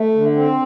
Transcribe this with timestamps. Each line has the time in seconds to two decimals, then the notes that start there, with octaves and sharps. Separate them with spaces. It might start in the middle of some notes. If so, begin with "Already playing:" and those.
Already playing: A3
0.15 D3
0.36 C4